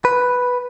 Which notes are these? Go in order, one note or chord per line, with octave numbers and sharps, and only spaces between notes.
B4